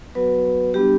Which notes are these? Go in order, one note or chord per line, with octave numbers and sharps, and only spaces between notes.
F#3 B3 F#4 B4
G3 B3 D4 G4